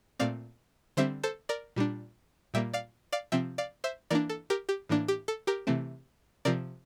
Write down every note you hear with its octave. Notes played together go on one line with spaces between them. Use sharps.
A#2 A3 C4 D5 F5
D3 G3 C4 C5 E5
A4 C5
A#4 D5
A#2 G3 D4
A#2 G3 A#3 E5 G5
D5 F5
D5 F5
C3 F3 C4 E5 G5
D5 F5
C5 E5
E3 A#3 D4 A#4 D5
A4
G4 A#4
G4
A2 E3 A#3 D4
G4
A4
G4 A#4
C3 E3 A3 C4
C3 F3 C4 A#4 D5